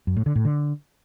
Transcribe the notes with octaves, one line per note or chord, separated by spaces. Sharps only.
F#2
A2
D3
A2
D3